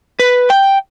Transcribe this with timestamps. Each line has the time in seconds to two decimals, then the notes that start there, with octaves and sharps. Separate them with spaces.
0.19 B4
0.50 G5